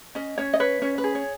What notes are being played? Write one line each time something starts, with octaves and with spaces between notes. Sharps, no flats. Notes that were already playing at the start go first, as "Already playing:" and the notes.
C#4 D#5
C#4 C#5
D#5
B4 C#5
C#4 C#5
B4
G#4
C#5